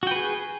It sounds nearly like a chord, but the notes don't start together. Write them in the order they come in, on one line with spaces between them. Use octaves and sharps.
F#4 G5 B4 G#4